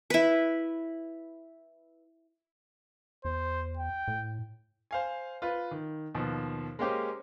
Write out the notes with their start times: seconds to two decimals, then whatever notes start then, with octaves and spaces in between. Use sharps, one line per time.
0.10 E4 B4
3.25 E2 C5
3.77 G5
4.08 A2
4.91 C5 F5 G#5
5.42 F4 B4
5.71 D#3
6.15 D#2 B2 F3
6.79 G#3 A#3 C#4 G4 C5